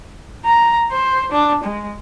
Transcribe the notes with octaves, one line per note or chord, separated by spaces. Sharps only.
A#5
C5
D4
G#3